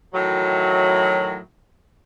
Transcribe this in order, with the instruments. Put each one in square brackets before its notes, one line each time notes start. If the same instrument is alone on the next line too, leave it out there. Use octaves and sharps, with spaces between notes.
[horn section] A2 D#3 E3 F#3